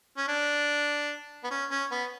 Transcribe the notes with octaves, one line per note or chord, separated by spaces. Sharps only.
C#4
D4
B3
C#4
C#4
B3